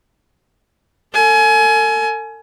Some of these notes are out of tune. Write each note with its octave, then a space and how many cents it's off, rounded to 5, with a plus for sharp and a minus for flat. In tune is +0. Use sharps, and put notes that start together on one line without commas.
A4 +40 G#5 +30